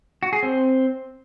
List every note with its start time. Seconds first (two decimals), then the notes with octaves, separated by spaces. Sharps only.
0.23 F#4
0.33 G#4
0.43 C4